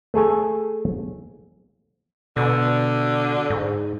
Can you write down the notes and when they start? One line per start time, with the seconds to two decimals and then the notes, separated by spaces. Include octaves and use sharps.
0.14 A3 G#4 A4 G#5
2.37 B2 D3
3.50 G#2